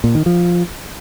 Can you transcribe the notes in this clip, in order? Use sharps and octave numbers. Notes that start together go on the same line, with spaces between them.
A#2
D#3
F3